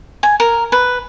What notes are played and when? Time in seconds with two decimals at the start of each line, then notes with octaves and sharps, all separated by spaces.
0.23 G#5
0.40 A#4
0.72 B4